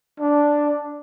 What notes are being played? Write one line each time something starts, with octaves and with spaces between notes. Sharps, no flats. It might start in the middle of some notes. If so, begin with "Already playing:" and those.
D4